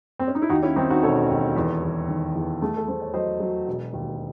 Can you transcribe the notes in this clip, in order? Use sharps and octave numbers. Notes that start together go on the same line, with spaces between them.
C4
C#4
D#4
E4
D#2 D#4 F#4
C#4 E4
D#3 C4 D#4
D#4 F#4
E1 A4 C#5
D#2
E2
E2
D#3
E2
A3 G#4
A4
A3 C5
C#5
F#3 C5 D#5
F#3
E1
D#2